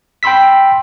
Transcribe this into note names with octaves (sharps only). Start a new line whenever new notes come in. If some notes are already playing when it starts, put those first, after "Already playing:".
G5 B5 C6 E6 B6